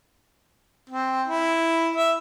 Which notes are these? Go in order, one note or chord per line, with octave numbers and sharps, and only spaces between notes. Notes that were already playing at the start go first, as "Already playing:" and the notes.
C4
E4
E5